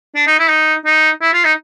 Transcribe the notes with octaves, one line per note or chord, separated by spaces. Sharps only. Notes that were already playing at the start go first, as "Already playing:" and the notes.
D4
D#4
E4
D#4
D#4
E4
F4
D#4